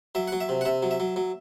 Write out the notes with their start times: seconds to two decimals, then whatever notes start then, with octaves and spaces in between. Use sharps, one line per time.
0.15 F#3 E5
0.28 F#3 F#5
0.40 E5
0.49 C3
0.61 F#5
0.65 C3 E5
0.83 F#3
0.91 E5
1.00 F#3
1.16 F#3